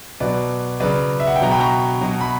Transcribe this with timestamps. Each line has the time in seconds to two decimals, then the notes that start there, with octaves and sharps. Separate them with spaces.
0.20 B2 F#3 B4 D5
0.80 C#3 F#3 B4 D5
1.20 E5
1.27 F#5
1.36 G5
1.41 B2 F#3 A#5
1.51 G5 B5
1.60 A#5 C#6
2.01 B2 F#3
2.21 B5